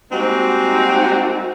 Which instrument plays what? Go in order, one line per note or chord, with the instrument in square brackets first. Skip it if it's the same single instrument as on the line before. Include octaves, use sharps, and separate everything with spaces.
[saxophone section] G3 G#3 A#3 C4 D#4 F#4